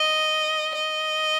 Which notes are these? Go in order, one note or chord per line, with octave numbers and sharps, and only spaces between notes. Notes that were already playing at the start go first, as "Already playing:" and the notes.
Already playing: D#5
D#5